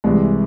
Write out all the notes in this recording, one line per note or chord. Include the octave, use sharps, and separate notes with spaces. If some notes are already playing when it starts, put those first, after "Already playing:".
C2 C3 E3 G#3